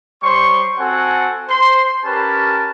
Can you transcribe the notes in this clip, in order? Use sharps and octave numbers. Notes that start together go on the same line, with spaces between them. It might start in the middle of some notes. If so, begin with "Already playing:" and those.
G3 C5 C#5 C6 C#6
C4 F#4 A4 F#5 G#5
C5 C6
C#4 G4 A#4 B4 A5